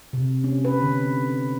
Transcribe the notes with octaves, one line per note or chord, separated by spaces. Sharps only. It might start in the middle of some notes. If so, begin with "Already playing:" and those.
C3
C#4
B4
D3